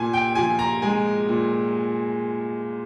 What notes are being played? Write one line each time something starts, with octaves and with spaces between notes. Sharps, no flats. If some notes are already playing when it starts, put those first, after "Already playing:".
Already playing: A#2 G#5
G5
F3 G#5
A#5
G#3 G#5
A#2